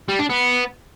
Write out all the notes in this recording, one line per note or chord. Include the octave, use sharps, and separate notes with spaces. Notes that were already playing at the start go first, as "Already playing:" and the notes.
G3
D4
B3